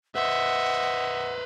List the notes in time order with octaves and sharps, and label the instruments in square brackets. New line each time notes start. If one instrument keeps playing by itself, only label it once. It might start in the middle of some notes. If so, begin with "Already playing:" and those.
[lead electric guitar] B4 C5 [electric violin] D#5 E5 [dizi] F#5